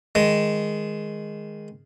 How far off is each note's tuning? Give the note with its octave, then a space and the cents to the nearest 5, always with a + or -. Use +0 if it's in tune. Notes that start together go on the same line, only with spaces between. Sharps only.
D#3 +0 G#3 +0